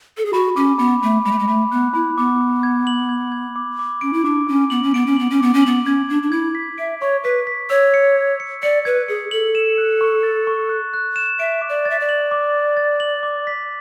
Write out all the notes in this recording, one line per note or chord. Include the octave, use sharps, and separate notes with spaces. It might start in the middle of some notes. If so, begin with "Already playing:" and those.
A4
G#4
F#4 B5
C#4 D6
B3 B5
A3 B5
G#3 B5
A3
G#3
A3 B5
B3 F#6
E4 B5
B3 D6
D6
G#6
F#7
G#6
G#6
D6
D6
C#4 D7
E4
D4 D6
C#4 D6
B3 F#7
C#4
B3 D7
C#4
B3 F#7
C#4
B3 D6
C#4
B3 F#7
C#4 G#6
D4 G#6
D4
E4 G#6
B6
E5 D7
C#5 C#6
B4 B6
B6
C#5 E6
C#7
G#6
C#7
D5 C#7
B4 G#6
G#4 C#7
A4 F#7
E7
F#6
C#6
A6
C#6
F#6
F#6
E7
E5 D7
D6
D5
E5 A6
D5
F#7
D6
D6
A6
F#7
D6
B6